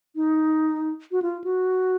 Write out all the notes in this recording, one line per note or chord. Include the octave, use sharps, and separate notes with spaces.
D#4
F#4
F4
F#4